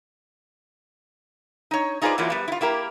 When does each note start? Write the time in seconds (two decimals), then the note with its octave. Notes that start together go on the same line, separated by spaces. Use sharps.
1.71 D#4 C#5
2.02 D#4 F4 G#4 B4 C5 D5
2.18 E3 F#3 A#3 E4 F4
2.30 G3 B3
2.48 E4 F4
2.61 A#3 E4 G4 A#4